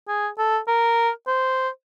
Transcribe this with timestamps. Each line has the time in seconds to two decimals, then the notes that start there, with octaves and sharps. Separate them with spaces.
0.08 G#4
0.38 A4
0.68 A#4
1.27 C5